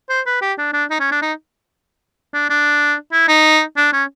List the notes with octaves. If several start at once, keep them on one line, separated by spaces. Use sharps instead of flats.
C5
B4
G4
D4
D4
D#4
C#4
D4
D#4
D4
D4
E4
D#4
D4
C#4